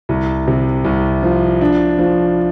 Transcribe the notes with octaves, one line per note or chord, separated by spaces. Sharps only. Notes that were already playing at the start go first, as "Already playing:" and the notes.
C2
C3
C2
F3
D4
F3